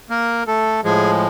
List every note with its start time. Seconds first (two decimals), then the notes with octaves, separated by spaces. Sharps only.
0.10 A#3 A#4
0.47 A3 A4
0.84 A2 F3 G#3 G#4